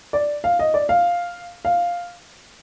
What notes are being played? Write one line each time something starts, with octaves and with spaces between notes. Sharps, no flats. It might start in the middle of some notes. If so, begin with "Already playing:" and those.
D5
F5
D#5
D5
F5
F5